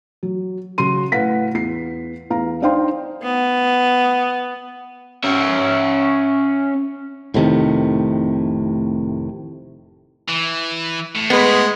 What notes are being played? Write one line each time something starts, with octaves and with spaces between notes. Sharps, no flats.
F#3
C#3 F#3 F#4 C6 D#7
A2 B4 F5 F#5 B6
E2 C7
E2 F5 A#5
D4 D#4 C5 F5 G5 C6
B3
C#4 E5
F1 A2 C3 D#3
E3
A2
G#3 B3 B4